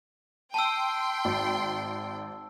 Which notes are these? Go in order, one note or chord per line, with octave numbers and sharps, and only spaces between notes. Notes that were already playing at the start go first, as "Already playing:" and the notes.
G5 A5 C6 E6
G#1